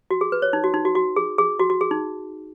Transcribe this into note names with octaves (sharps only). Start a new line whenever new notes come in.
F#4
G#4
B4
C#5
D#4
F#4
D#4
F#4
F#4
G#4
G#4
F#4
F#4
G#4
D#4